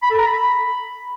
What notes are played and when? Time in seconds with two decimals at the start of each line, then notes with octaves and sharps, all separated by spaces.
0.03 B5
0.11 A4
0.19 A#5
0.27 B5